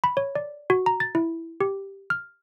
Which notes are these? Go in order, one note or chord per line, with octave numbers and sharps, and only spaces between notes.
B5
C#5
D5
F#4
A#5
A6
E4
G4
F6